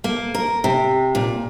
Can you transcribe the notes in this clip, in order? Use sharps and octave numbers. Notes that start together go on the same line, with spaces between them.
A#3
A#4
C3
A#2